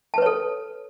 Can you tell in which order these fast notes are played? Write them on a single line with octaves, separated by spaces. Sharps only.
A5 B4 C#5 A4